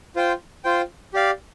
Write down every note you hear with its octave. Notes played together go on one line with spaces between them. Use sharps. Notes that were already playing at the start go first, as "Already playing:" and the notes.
F4 C5 G5
F4 C5 G5
G4 D5 F5